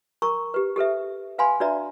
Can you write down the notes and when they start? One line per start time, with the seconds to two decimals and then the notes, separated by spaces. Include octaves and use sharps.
0.22 A#4 A#5 C#6
0.54 G4 B4
0.76 G4 A4 B4 E5
1.38 B4 F5 G#5 B5 C6
1.60 D4 F#4 B4 D5 E5 A#5